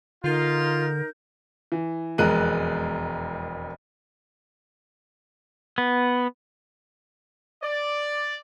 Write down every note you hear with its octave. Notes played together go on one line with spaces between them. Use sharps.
D3 D#4 F4 A#4 G6
E3
E1 F2 G#3 A#4 F#6 D#7
B3
D5